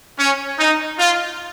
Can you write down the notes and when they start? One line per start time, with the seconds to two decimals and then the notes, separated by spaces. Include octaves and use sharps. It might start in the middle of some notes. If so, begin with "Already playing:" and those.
0.18 C#4
0.59 D#4
0.99 F4